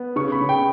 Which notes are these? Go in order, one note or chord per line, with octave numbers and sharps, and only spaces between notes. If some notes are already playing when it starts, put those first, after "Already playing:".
Already playing: B3
C#3 C#6
B5
C#3
G5